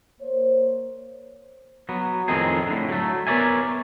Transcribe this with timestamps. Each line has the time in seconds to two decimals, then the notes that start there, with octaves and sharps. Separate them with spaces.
0.21 A#3 C5 C#5
1.89 F#3 B3
2.28 F2 A2 D#3 C4 D#4 G#4
2.67 A2 D3
2.89 F#3 A3
3.27 B3 A#4 C#5 D5 E5 G#5